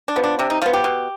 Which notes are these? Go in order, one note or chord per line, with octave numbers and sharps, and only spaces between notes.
D4
F3 B3
D4
C3 D4
D#4
F3 B3 F4
G4
B2